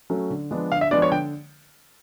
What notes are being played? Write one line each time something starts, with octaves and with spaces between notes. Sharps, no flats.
F#3 A3 C#4
D3
F3 G#3 B3 D4
D3 F5
E5
F3 G#3 B3 D4 D5
C#5
D3 G5